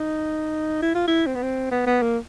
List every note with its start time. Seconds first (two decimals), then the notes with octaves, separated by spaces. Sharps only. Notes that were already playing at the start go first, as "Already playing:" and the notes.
Already playing: D#4
0.82 E4
0.95 F4
1.08 E4
1.27 C4
1.35 B3
1.43 C4
1.72 B3
1.86 B3
2.02 A#3